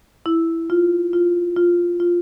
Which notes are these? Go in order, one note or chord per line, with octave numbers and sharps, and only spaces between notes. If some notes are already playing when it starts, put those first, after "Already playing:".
E4
F4
F4
F4
F4